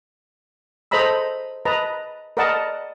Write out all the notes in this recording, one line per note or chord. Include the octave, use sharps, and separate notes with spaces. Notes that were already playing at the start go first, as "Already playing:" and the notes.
A4 C5 D#5 A#5 B5 E6
B4 D#5 A5 A#5
A#4 B4 D5 D#5 F#5 A5